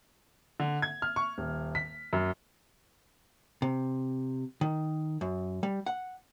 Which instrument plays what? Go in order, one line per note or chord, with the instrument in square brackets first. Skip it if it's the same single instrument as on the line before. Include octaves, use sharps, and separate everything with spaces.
[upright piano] D3
G#6
F6
C#6
D#1
B6
F#2
[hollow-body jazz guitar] C3
D#3
F#2
G3
F#5